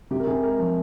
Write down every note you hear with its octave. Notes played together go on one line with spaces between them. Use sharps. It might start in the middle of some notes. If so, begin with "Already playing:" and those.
C3 G4
A#4
C3 G#4
G#3 A#4
F3